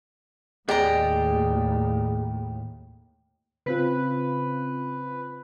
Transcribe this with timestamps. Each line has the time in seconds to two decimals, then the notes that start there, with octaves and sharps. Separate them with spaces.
0.69 D#2 A2 G4 G#4 D5 D#5 A#5
3.66 C#3 C4 F4 B4